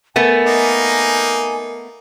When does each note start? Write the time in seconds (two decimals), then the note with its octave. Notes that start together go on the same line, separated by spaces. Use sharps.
0.16 A3 B3 A#4 G#5
0.46 A#3 D#4